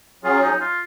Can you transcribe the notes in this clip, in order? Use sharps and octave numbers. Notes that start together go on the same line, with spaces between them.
F#3 C#4 F4 G#4
D#4
F4